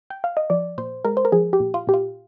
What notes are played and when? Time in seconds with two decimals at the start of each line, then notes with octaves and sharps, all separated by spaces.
0.10 G5
0.24 F5
0.37 D#5
0.50 F3 D5
0.78 A#2 C5
1.05 G#3 A#4
1.17 C5
1.25 A#4
1.32 F3 G#4
1.53 G4
1.60 A#2
1.74 F4
1.87 A#2 G4
1.94 F4